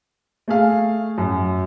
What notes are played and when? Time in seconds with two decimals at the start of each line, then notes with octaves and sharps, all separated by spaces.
0.48 A3 G#4 F5
1.18 F#2